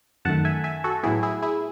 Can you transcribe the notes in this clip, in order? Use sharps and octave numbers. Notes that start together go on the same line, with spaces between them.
F#2 D#3 A3 F#5 A5
E5 G#5
E5 G#5
F#4 A4
A2 F#3 B3 E4 G#4
E4 G#4
E4 G#4